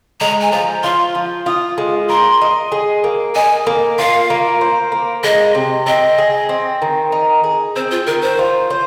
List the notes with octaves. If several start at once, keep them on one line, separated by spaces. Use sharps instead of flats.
G#3 A#5
G#5
F3 A#5
F4 C6
F3
F4 D#6
G#3
A#4 C6
D#5
G#4
A#3
D#5 G#5
A#3
F4 F5
A#3
C5
A#3
G#3 D#5
C3
C4 D#5
G#4
C4
D#3
D#4
G#4
C4 C5
F4
D#3 A#4
C5
F4
C5